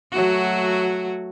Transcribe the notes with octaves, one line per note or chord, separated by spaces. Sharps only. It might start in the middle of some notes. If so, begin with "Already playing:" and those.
F#3 A3 F#4